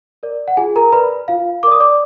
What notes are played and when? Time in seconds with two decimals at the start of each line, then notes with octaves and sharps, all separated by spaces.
0.23 A#4 D5
0.48 F#5
0.57 F4 G#4 G#5
0.76 A#4 A#5
0.92 A#4 B4 D5 B5
1.28 F4 F5
1.63 A#4 D5 D6
1.72 D#6
1.80 D5 D6